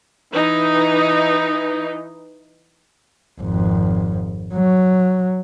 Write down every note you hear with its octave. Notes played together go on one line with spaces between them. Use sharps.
E3 D#4
G#1 F2
F#3